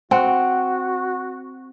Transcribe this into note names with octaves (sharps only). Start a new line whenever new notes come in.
C4 F#4 F#5